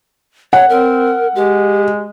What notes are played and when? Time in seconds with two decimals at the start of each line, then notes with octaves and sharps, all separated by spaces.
0.53 C#5 F#5
0.69 C4 A#4
1.35 G#3 G4